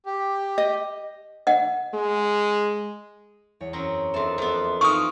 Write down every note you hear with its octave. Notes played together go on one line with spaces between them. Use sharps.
G4
D#5
D#5 F#5
G#3
E2 C#5
F#2 C4 A#5
F2 C4 D4 A4 A#4 E5 C6
F2 B3
E3 F3 A#3 D#4 D#5 F5 C#6 D#6